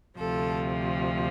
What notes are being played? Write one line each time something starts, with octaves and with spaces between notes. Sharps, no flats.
D2 C3 F3 A4